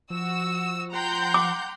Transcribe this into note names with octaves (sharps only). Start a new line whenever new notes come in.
F3 F#4 E6
F#5 G5 A#5 C6 G6
D6